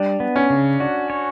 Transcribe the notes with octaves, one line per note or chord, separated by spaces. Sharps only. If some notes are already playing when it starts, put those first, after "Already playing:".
Already playing: G3 D4
B3
C#4
C#3
D4 F#4
C#5